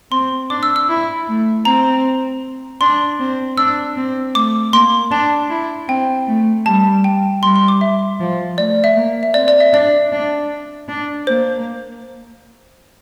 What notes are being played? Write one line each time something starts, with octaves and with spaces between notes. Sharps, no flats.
C4 C6
D4 D6
E6
E6
E4
A3
C4 A#5
D4 C6
C4
D4 E6
C4
A3 D6
A#3 C6
D4 A5
E4
C4 G5
A3
G3 A5
G5
G3 C6
C6
D6
E5
F3
A3 D5
E5
A#3
E5
C4 D5
D5
E5
D4 D5
D4
D4
A#3 C5